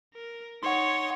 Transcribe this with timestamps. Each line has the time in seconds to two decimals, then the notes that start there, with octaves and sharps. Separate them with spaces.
0.14 A#4
0.63 D#4 C#5 F#5 C6